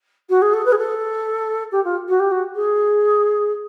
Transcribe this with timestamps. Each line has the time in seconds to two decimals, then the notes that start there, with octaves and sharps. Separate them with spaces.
0.29 F#4
0.41 G#4
0.53 A4
0.65 B4
0.72 G#4
0.77 A4
1.71 G4
1.84 F4
2.08 F#4
2.19 G4
2.31 F#4
2.55 G#4